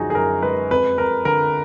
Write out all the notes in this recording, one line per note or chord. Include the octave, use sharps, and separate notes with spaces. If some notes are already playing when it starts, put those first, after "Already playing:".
Already playing: F#2 D3 F3 G#3 D#4 F#4 G#4
G#4
F#2 A#4
G#3 B4
F2 B4
F2 A#4
D3 A#4